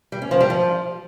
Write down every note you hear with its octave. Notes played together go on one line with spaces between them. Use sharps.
G3
C#4
F3
G3
F3